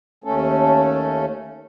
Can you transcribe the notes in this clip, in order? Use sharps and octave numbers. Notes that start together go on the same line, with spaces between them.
D#2 A3 C#4 A4